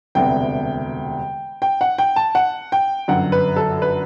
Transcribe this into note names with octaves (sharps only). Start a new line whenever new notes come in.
E1 D2 C3 G3 B3 G5
G5
F#5
G5
A5
F#5
G5
G1 F#2 D3 F#5
B4
A4
B4